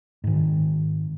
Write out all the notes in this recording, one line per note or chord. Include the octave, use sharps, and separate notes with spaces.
G#2 D#3